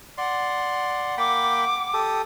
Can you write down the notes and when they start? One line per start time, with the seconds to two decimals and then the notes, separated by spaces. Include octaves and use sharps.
0.18 D5 F#5 C6
1.18 A#3 G5 B5 D6
1.94 G4 A4 D#6